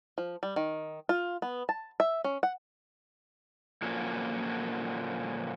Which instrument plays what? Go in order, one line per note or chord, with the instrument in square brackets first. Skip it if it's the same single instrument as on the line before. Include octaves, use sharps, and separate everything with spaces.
[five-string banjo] F3
G3
D#3
F4
B3
A5
E5
C#4
F#5
[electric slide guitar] A#2 D3 F3 F#3 A#3 C#4